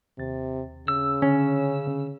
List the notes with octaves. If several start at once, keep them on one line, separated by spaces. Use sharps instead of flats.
D#2 C3 A6
C#3 E6
D3 C#4